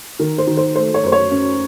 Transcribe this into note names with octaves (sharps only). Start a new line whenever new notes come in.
D#3 A#4
C5
D#3
C5
A3 C5
C#5
F#2 C5
C#5
C#4